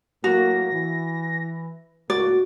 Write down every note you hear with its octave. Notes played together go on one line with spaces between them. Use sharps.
A2 F#3 A#3 F#4 A#6
E3
C#2 A2 A#3 F#4 D5